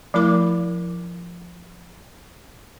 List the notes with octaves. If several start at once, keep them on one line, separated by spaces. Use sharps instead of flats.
F3 A3 E4 A#4 D6